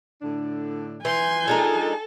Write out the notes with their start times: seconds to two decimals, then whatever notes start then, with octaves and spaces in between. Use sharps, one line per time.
0.21 A2 D3 D4
1.05 E3 G#5 C6 G6
1.48 G#3 D4 D#4 F4 A4 A#4